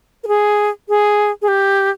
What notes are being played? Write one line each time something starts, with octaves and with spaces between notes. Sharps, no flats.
A#4
G#4
G#4
G#4
G4